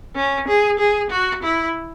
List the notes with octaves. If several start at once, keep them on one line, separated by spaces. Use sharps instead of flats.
C#4
G#4
G#4
F#4
E4